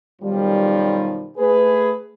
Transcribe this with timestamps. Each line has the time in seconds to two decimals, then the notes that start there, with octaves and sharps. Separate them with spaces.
0.22 B1 F#2 D#3 F3 G3
1.38 A3 G#4 B4